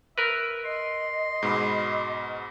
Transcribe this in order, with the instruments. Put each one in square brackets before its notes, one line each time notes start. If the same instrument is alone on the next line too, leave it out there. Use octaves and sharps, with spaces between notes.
[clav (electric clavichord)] A#4 B4 [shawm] E5
[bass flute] D#5 [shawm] C6
[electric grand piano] G#2 B2 B5